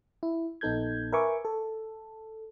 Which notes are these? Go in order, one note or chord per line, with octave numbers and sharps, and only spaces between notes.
E4
A#1 B3 D#4 A4 G6 G#6
A#4 B4 E5 G#5 C#6 D6
A4